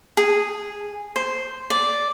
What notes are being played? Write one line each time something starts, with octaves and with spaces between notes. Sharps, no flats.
G#4
C5
D5